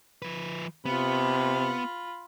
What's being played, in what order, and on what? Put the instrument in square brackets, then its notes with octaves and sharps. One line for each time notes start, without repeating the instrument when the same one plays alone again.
[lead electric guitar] F3 B4
[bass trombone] C3 [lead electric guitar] B3 [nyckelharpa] F4 B5